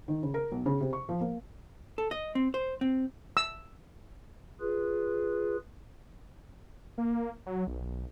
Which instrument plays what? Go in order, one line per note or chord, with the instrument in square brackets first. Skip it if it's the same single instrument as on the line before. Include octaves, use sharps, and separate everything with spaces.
[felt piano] D#3
C#3
A#4
B1
C#3
C3
C#6
F3
A#3
[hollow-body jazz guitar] A4
D#5
C4
C5
C4
[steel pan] E6
[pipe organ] F4 G#4 B4
[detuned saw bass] A#3
F#3
B1